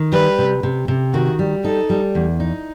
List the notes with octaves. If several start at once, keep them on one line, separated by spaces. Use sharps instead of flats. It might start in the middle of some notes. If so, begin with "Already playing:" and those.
Already playing: D#3
G3 B4
C3
C3
C3
D#3 F#4
G3
D#4 A4
G3
E2
D#4